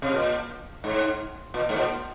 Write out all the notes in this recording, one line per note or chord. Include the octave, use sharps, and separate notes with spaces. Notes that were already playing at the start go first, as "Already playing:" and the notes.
C3
A#2
G#2
A#2
G#2
A#2